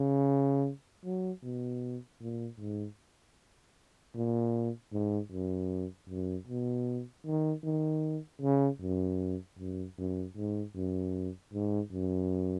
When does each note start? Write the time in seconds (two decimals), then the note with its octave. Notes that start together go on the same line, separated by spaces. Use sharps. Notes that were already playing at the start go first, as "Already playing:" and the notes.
Already playing: C#3
1.04 F#3
1.43 B2
2.21 A#2
2.59 G#2
4.15 A#2
4.92 G#2
5.32 F#2
6.09 F#2
6.47 B2
7.26 D#3
7.64 D#3
8.42 C#3
8.82 F#2
9.59 F#2
9.98 F#2
10.36 G#2
10.75 F#2
11.53 G#2
11.92 F#2